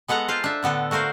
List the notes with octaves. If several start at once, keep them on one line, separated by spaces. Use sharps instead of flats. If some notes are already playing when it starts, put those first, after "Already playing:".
G#3 B3 A4 F#5 A#5
F4 C5 F5
D4 E5
A2 D3 B3 A4
A3 F#4 A#4 C5 F5